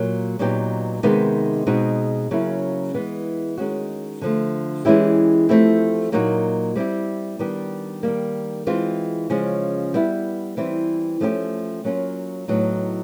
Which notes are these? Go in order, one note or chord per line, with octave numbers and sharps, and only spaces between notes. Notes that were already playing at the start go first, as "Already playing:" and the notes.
Already playing: A#2 F#3 A#3
A#2 F#3 B3 D#4 G4
C3 D#3 G#3 B3 D#4
B2 G#3 C4 D#4 F#4
C#3 F#3 A#3 C#4 E4
E3 G#3 B3
D#3 G#3 C#4 F#4
D3 F3 A3
E3 G#3 C#4 E4 G4
F3 A3 C4 E4 G4
A#2 F#3 A#3 D#4 F#4
G3 C4 E4 G4
D#3 G3 B3 D4 G4
D#3 G3 A#3
E3 G#3 C4 F4
C#3 F3 G#3 C#4
G3 B3 E4
E3 G3 C4 E4
F3 A3 C#4 E4 G4
F#3 A#3 C#4 F4
A2 F#3 B3 D#4